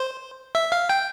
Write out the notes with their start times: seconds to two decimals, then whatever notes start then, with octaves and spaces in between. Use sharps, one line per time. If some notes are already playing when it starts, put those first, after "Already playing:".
Already playing: C5
0.55 E5
0.72 F5
0.89 G5